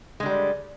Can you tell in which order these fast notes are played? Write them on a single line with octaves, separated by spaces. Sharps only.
G#3 D3 G3